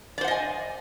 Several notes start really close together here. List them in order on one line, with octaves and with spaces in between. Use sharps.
D5 C5 F#5 D#5 G#5